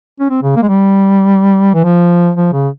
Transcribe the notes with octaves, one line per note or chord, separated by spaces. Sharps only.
C#4
C4
C#3
A#3
G#3
G3
E3
F3
F3
C#3